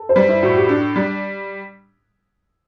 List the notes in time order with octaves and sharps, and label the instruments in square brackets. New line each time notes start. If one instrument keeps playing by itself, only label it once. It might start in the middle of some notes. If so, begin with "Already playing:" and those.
Already playing: [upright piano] A4
C5
[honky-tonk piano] G3 [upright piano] B4
[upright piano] E4
[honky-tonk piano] A2 [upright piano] F#4
[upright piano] G4
[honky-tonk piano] D4
G3